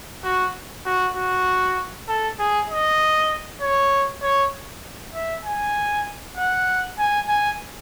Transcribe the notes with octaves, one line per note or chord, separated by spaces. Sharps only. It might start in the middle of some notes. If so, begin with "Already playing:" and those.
F#4
F#4
F#4
A4
G#4
D#5
C#5
C#5
E5
G#5
F#5
G#5
G#5